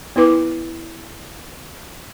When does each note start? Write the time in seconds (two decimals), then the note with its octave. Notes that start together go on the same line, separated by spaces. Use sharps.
0.16 B3 E4 B4 D6